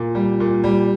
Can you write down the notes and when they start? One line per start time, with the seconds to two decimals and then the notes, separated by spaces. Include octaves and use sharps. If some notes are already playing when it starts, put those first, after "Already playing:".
Already playing: A#2
0.15 G3
0.40 A#2
0.64 G3